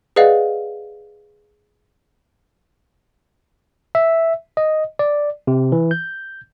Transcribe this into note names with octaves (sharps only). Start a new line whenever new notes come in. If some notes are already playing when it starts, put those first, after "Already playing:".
G#4 B4 D5 D#5 F5 F#5
E5
D#5
D5
C3
E3
G6